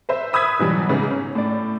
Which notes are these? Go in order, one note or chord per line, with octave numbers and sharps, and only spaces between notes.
B4 C5 E5
B5 D#6 E6 F#6 G#6 B6
B2 E3 F#3 G3
G#2 C#3 B3 D#4
C#4
A2 D5